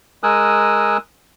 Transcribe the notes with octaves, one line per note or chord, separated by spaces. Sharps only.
G#3 A#4 G#5 D#6 E6 F#6